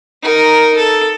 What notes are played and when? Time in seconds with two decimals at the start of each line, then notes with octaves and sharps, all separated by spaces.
0.23 D#4 A#4
0.77 A4